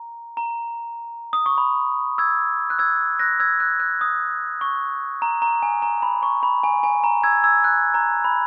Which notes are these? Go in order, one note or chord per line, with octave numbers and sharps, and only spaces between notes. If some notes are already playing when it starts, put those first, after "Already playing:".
Already playing: A#5
A#5
D#6
C#6
B5
E6 G#6
F#6
E6 G#6
F#6 A#6
E6 G#6
F#6
F#6
D#6
C#6
A#5
A#5
G#5
A#5
B5
C#6
B5
G#5
G#5
A#5
E6 G#6
E6 G#6
F#6
A#5
B5